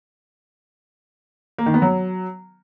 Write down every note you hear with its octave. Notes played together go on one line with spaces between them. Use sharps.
A#3
D#3
B3
F#3